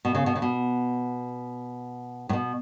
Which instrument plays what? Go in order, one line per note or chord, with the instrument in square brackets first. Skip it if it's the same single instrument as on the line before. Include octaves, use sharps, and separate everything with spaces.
[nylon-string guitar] B2
C#3
B2
C#3
B2
A2
B2